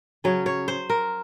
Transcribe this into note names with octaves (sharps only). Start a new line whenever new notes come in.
C#3 F#3 C#4 C#5
C#5
C5
A#4